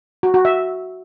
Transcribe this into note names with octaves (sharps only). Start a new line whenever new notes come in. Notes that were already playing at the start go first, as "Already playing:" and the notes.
F#4
F#4
E5